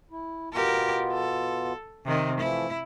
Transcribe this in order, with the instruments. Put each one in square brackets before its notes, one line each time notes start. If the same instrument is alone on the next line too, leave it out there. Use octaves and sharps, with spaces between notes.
[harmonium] E4
[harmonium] B2 B3 F4 [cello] G4 A#4
[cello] A4
C3 D#3
[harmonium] E3 F3 A3 [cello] E4